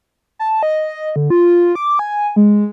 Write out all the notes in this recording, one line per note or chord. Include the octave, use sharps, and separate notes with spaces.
A5
D#5
D3
F4
D6
G#5
G#3